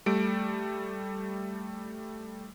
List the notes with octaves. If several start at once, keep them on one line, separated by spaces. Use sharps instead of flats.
G3 A3 D7